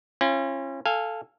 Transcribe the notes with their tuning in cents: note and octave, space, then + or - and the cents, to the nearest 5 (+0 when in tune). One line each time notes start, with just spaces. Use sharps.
C#4 -30 F4 -40
A4 +0 F5 -5 G#5 -20